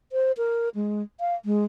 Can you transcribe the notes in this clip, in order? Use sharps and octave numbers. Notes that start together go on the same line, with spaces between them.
C5
A#4
G#3
F5
G#3